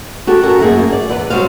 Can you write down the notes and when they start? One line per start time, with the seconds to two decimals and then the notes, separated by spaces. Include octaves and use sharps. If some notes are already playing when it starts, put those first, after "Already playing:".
0.27 F#4 G4 A4
0.43 C#4 F#4 A4 A#4
0.60 F#2 A3 A#3 G#4
0.92 D5
1.09 E2 B4
1.30 F#3 G3 C4 F5